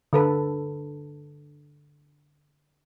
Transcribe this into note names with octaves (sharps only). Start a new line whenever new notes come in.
D3 A4 B4